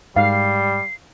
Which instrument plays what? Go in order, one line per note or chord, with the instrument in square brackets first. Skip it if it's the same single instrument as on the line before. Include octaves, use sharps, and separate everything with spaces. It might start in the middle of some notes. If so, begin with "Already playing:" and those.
[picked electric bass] G#2 [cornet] G3 [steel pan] F5 [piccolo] C7